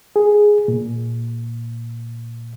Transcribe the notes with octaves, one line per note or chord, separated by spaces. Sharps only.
G#4
A#2